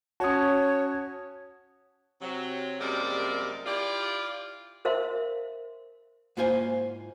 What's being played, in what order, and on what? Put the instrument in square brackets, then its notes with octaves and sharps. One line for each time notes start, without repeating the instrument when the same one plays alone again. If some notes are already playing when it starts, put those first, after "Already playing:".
[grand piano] C#4 F#4 [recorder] C#5 [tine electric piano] A5 D#6
[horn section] C3 F#3
F#2 C3 G3 G#3 A#3 D5
E4 F4 G4 D5
[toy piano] A#4 C5 E5 F5 C6
[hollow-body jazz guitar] G#2 A#3 E4 F4 C5 G#5